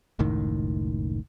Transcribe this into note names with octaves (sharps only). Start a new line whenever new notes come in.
F#1 C#2 A2 D#3